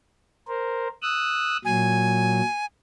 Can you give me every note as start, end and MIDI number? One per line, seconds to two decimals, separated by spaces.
0.48 0.88 70
0.48 0.88 72
1.02 1.57 87
1.02 1.57 88
1.02 1.57 90
1.65 2.42 46
1.65 2.42 54
1.65 2.65 80